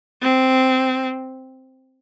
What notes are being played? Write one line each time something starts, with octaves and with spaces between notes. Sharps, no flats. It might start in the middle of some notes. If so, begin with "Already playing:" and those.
C4